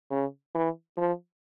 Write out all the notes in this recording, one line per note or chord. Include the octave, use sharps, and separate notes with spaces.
C#3
E3
F3